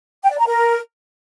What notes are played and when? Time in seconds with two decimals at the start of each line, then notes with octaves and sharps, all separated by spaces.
0.23 G5
0.31 D5
0.38 A#5
0.46 A#4